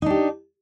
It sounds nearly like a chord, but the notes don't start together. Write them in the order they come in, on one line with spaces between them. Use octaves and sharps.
D#4 D4 G4